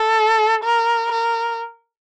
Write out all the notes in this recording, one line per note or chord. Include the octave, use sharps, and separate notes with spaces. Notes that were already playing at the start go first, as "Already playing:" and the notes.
Already playing: A4
A#4
A#4